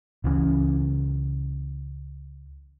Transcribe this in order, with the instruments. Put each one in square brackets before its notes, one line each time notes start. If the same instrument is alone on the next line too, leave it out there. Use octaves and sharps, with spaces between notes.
[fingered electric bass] C#2 C#3 E3 C#4